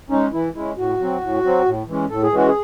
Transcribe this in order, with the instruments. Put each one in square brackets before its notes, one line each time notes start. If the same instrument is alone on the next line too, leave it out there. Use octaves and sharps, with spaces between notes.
[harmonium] G#3 C#4 D#4
E3 E4
G#3 C#4 E4
A2 F#4
F#3 C4
A2
F#3 C4
A2
E3 G#3 C#4
A2 A4
G#4
E3 G#3 C#4 F#4
G#4